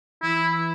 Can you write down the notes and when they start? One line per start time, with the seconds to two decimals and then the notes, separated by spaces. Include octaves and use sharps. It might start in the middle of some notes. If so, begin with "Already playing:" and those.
0.22 E3 E4